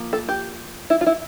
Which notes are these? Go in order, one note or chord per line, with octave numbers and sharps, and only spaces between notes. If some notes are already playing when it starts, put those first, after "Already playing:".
Already playing: F3 A#3
A4
G4
E4
F4
E4